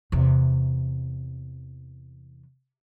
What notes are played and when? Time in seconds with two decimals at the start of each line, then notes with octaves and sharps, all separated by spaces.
0.12 E2 C3